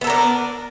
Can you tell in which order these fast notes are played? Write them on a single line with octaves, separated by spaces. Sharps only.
B3 A4 A#4 D4